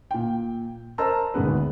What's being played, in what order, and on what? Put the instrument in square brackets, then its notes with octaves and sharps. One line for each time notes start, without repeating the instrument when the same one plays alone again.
[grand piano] A#2 G5
A#4 C5 D#5 A5 A#5 E6
G#1 D2 D#3 B3 G#4 B4